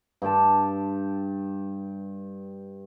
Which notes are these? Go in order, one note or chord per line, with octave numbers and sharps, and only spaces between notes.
G2 G4 G5 A5